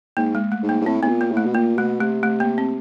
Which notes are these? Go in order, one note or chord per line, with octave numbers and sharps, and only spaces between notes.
G#2 A#3
G#3
A3
G#2
A#3
G#2
A2 C4
A2 B3
A#2
A#3
A2
A3
B2
A#2 A#3
B2 A3
C3 A3
A3
A#3
C4